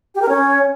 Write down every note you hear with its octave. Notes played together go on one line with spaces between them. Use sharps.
G4
A#4
C#4